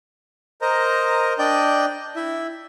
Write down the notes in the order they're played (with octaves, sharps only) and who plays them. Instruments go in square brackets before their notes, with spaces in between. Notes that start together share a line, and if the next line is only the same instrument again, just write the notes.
[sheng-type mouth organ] A#4 C5 D#5 A#5
D4 D5 D#5 G5 G6
E4 E5